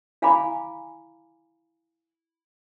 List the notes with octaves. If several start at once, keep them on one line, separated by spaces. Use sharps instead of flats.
E4 F5 G#5 A#5 B5 D6